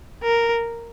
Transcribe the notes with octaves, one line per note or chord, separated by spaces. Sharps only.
A#4